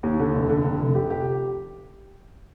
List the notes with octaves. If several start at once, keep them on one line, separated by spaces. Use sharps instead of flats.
D#2
D3
F1
D3
F1
F1
G4
G4